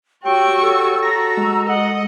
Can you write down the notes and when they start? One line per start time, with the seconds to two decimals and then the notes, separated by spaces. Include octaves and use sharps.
0.25 F#4 G4 C#5 G5 C#6 E6
0.62 A4
1.02 F#4 A#5 E6 A#6
1.37 G#3
1.69 D#5 F#5